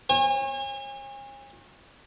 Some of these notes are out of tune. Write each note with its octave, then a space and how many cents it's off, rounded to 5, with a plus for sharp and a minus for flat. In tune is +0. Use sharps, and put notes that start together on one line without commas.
C#5 -35 G#5 -40